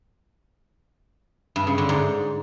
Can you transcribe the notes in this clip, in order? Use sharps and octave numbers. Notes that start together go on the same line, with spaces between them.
G2
C#3
D3
G#2